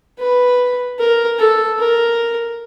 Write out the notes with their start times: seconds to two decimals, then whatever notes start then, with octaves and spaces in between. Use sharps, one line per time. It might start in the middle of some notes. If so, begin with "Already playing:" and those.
0.19 B4
0.99 A#4
1.39 A4
1.79 A#4